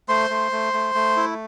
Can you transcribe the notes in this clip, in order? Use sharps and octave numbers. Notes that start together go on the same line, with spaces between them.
A3 C5 C6
A3
A3
A3
A3
E4